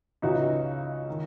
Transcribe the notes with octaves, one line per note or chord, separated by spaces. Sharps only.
C#2 C#3 E3 D#4 F#4
D#3